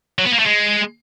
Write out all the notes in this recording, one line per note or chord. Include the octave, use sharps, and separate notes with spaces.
F#3
B3
A#3
A3
G#3